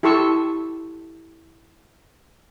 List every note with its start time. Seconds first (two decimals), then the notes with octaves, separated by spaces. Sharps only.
0.03 E4 G4 A4 C6 C#6 E6